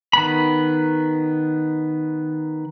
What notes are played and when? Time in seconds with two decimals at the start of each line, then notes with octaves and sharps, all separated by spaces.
0.13 D#3 B3 B5